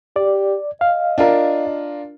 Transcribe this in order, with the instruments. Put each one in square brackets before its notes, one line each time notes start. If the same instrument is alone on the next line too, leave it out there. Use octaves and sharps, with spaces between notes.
[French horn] G4 [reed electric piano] D5
[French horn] D#5 [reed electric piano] F5
[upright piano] D4 F4 A#4